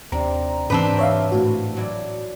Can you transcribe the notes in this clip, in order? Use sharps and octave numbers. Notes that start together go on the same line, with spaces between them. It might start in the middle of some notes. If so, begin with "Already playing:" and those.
D#2 C3 C4 D4 A#5
G#2 E3 G3 C4 D4 B4
C#5 E5 F5
A2 F#4
F#3 E4 D5